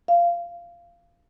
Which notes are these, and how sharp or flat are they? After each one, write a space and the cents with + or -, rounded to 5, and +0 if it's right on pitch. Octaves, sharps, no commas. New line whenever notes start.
F5 -15